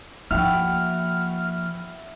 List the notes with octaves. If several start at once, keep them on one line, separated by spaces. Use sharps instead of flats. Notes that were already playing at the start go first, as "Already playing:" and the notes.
F3 A#3 E4 F#4 G5 F6